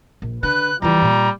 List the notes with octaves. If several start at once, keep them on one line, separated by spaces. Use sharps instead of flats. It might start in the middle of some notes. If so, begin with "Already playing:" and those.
A#1
D3 B4 F#6
E3 F3 G3 A#5
A#2 A#3